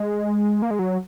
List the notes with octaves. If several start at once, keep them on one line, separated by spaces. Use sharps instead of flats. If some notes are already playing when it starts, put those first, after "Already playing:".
Already playing: G#3
A#3
G#3
F#3